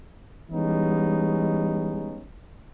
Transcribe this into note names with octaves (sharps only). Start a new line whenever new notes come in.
E3 G3 G#3 B3 C#4 D#4